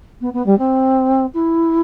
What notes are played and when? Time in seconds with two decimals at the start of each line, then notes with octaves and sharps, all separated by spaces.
0.21 B3
0.33 B3
0.46 G3
0.58 C4
1.33 E4